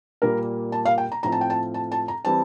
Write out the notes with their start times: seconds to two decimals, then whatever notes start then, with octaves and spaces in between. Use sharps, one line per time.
0.22 A#2 G3 A#3 A#4
0.72 A5
0.85 F5
0.98 G5
1.12 A#5
1.23 A2 F3 C4 A#5
1.32 A5
1.41 G5
1.50 A5
1.74 A5
1.92 A5
2.08 A#5
2.25 E3 G3 C4 A5